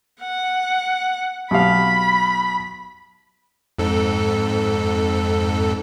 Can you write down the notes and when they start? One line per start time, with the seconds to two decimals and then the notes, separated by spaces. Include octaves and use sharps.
0.21 F#5
1.51 B1 G4 F5 B5
3.79 F2 G#2 A4